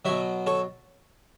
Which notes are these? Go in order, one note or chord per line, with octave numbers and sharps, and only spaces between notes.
B2 F#3 C#5 E5
A4 C#5